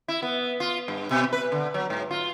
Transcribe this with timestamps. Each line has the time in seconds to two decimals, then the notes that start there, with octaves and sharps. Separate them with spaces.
0.08 E4
0.22 B3
0.60 F4
0.88 G2
1.11 B2
1.33 B4
1.52 D3
1.74 F#3
1.90 G#2
2.11 F4